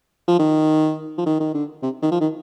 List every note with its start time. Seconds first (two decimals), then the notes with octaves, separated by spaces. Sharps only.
0.28 F3
0.39 D#3
1.18 F3
1.26 D#3
1.40 D#3
1.54 D3
1.82 C3
2.02 D#3
2.11 F3
2.21 D#3